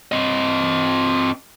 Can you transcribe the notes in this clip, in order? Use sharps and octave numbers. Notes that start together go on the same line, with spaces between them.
C4 D#5